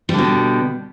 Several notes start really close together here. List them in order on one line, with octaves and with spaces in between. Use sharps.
G3 D3 B2